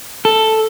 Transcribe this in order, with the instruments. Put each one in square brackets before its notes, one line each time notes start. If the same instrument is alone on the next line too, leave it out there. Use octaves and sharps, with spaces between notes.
[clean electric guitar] A4